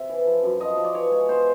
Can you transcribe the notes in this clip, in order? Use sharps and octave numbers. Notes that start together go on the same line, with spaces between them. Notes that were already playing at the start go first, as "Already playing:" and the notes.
Already playing: C3 E5
E3
F3
F#2
F3 D#5
F3
D5
E3 C#5
G#3
B3 C5